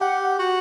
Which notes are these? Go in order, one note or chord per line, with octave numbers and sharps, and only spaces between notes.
G4 F#5
F#4